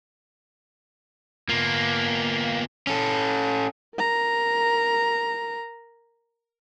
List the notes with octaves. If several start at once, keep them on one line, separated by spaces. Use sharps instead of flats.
A#3 B3 F4
C#4 A4
A#4 A#5